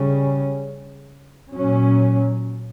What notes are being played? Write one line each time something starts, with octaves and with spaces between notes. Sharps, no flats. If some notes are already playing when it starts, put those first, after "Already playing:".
Already playing: C#3 G3 C#4
A#2 F#3 C#4